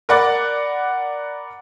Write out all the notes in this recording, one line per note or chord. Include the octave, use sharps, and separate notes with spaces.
A#4 D5 F#5 B5 D6 A6